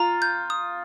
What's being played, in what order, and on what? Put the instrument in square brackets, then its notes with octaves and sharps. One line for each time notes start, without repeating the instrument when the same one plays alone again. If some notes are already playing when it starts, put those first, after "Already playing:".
Already playing: [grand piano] F4 [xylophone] A#5
[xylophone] G6
D#6